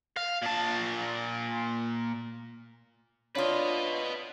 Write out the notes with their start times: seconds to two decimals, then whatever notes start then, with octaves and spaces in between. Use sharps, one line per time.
0.17 F5
0.42 A#2 A5
3.35 D4 F4 B4 C#5 D#5 F5